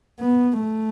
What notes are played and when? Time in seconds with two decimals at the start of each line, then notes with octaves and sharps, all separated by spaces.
0.20 B3
0.60 A3